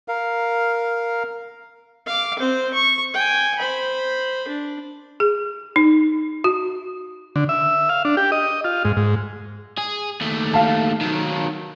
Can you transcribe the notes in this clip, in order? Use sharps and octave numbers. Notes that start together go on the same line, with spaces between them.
A#4 F5
F5 D6
C4 C5
C#6
G5 G#5
C5 B5
D4
G#4
D#4
F#4
D3
E5
F5
D4
G4
D#5
F4
G#2
G#2
G#4
D#2 A3
F5 A5
D#3 F#3